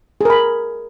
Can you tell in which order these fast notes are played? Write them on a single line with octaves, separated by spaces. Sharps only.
G#4 A#4 B5